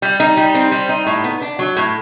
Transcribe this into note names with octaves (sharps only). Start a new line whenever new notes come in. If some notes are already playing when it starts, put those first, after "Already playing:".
G3
D#4
G3
C4
G3
D#4
A2
B3
D4
F#3
A2